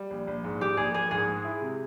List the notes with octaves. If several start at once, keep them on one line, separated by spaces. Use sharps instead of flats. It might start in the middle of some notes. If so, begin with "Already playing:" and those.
Already playing: G3
A#1
A#1
G#2
G3 G4
A#1 G#4
A#1 G#4
G#2 G#4
G#3
E4
C3